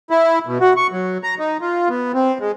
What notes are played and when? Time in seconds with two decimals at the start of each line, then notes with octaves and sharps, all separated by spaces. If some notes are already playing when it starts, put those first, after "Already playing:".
0.10 E4
0.47 B2
0.61 F#4
0.77 C#6
0.92 F#3
1.24 A#5
1.39 D#4
1.61 F4
1.89 B3
2.14 C4
2.41 G#3